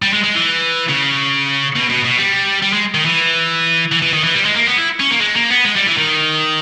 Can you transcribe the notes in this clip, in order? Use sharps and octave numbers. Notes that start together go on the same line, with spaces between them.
G3
G#3
G#3
E3
C#3
B2
B2
B2
G3
G3
G#3
D#3
E3
E3
E3
D#3
E3
G3
G#3
A#3
B3
E4
C#4
A#3
G#3
A#3
B3
G#3
G3
E3
D#3